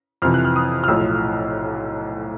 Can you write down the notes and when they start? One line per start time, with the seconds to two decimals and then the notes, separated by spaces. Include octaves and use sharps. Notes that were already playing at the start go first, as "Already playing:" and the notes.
0.22 F2 C3 E3 F6
0.34 F#6
0.45 F6
0.56 D#6
0.84 F6
0.88 B1 A2 F3 E6